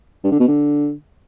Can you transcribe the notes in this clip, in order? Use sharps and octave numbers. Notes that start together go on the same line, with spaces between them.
G2
D3
B2
D3